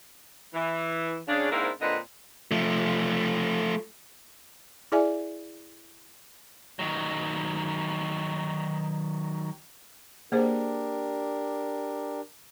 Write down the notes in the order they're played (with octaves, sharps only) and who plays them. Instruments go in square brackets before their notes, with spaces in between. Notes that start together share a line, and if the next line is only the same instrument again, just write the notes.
[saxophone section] E3
C#3 D4
G#2 A#3 C4 D4 E4 A#4
A#2 D3 C4 B4 D5 D#5
[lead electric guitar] F3 A3
[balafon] E4 G#4 D5 E5 G#5
[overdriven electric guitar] D#3 F#3
[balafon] A#3 G#4 C5 [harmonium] D4 G4 A#4